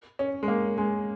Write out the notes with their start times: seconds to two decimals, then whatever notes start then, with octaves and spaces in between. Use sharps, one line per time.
0.19 C#4
0.43 G#3
0.48 A#3
0.78 G#3